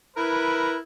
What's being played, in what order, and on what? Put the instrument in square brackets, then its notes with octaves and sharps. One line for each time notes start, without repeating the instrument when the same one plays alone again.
[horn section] E4 A#4 B4